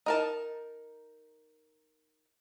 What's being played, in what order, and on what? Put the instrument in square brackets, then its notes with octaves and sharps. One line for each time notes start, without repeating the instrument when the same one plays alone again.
[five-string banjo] D#4 A#4 A5